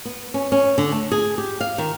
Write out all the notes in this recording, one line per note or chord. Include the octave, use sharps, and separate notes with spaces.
B3
C#4
C#4
D3
A3
G#4
G4
F5
D#3